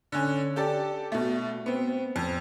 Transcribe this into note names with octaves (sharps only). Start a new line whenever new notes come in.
D3 C#4
G4 A4 D5
B2 A3
B3 C4
F2